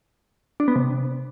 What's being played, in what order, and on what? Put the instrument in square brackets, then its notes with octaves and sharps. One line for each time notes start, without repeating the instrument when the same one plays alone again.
[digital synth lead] D4
B3
C3